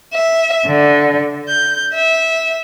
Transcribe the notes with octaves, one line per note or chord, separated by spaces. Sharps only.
E5
D3
G6
E5